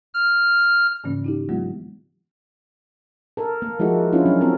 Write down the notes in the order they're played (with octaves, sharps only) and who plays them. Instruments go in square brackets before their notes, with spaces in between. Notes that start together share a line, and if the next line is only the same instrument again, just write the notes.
[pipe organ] F6
[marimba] G#2 C#3 E3 A#3 C#4
D#4 E4 G4
E3 F#3 G#3 A#3 B3 F4
[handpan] A4 A#4
A#3
F3 G#3 E4 F#4 A4
C#4 D4 E4 F4
F#3 C#4
C4 A4 A#4